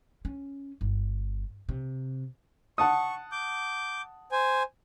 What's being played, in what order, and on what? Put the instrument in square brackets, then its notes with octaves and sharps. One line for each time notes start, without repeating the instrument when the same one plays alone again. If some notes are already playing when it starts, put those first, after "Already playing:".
[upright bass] C#4
G1
C3
[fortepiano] F#5 A5 D#6 [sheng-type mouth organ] C#6
[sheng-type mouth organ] D6 G6
C5 G#5